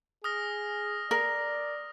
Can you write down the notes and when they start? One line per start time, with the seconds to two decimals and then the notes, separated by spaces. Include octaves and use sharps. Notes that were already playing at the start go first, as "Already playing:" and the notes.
0.24 G#4 D#6 F6 A#6
1.11 A#4 D5